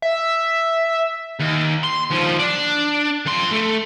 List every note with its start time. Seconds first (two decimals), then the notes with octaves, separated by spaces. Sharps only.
0.02 E5
1.40 D#2
1.83 C6
2.10 D#2 F3
2.39 D4
3.26 F2 C6
3.52 A3